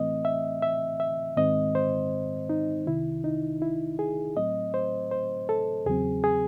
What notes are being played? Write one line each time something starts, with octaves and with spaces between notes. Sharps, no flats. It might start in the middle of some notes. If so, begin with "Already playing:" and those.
Already playing: A2 E3 A3 C4 D#5
E5
E5
E5
G#2 D#3 G#3 C4 D#5
C5
D#4
C2 C3 D#3 E4
D#4
E4
G#4
A2 F#3 A3 C4 D#5
C5
C5
A4
E2 C#3 F#3 C4 G#4
G#4